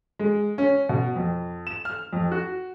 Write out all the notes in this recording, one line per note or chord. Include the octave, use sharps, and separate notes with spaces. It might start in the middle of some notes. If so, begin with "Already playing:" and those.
G#3
C#4
B2
F2
E7
F6
F2
F#4